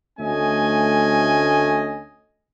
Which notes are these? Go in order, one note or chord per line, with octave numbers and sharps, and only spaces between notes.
D2 A3 C#4 D#5 G#5